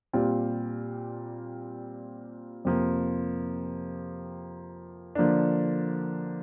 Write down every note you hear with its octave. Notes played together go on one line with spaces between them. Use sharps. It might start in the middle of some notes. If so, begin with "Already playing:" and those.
A#2 G3 C4 F4
F2 C3 F3 A#3
D3 F3 A#3 D4